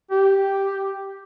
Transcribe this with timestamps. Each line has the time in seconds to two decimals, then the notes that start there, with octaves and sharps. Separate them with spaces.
0.11 G4